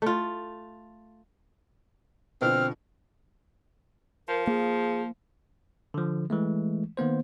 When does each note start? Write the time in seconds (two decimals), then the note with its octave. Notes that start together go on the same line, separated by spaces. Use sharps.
0.02 A3 F4
2.42 B2 D3 F3 C4 F6
4.28 F3 A#4
4.47 A#3 G#4
5.94 D3 F3
6.30 E3 G#3 A3
6.97 D#3 A#3 B3 C5